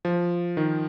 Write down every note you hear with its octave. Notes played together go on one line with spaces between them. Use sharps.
F3
D#3